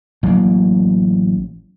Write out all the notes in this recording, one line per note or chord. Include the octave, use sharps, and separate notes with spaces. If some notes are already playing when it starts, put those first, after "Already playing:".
A1 F#3 G3 A#3